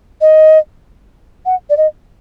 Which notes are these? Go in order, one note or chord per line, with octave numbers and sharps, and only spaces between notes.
D#5
F#5
D5
D#5